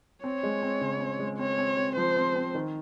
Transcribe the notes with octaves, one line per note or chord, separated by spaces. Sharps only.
C4 C#5
G#3
C4
C#3
C4
G#3
C4 C#5
C4
C4
F3 C5
C4
C4
D#3